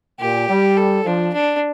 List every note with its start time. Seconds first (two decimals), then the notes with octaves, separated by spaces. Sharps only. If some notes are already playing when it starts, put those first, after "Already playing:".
0.20 A#2 G4
0.49 G3
0.77 A4
1.05 F3 D4
1.33 D4